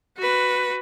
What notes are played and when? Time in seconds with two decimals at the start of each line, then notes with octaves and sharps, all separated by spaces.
0.17 F#4 B4